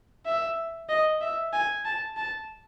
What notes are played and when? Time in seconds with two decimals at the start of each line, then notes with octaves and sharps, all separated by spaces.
0.26 E5
0.89 D#5
1.21 E5
1.53 G#5
1.85 A5
2.17 A5